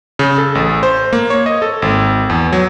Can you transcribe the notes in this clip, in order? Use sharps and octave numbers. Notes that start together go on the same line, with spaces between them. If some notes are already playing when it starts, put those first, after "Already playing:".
C#3
A4
A1
C5
A#3
C#5
D#5
A4
G#1
E2
F#3